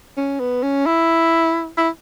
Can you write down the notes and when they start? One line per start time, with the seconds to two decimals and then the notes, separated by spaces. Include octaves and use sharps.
0.17 C#4
0.40 B3
0.63 C#4
0.86 E4
1.78 E4